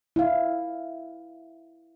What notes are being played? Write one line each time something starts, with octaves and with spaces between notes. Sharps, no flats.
E4 F5